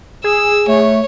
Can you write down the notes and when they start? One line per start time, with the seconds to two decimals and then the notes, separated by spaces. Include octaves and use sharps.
0.24 G#4 E6
0.68 A3 C#5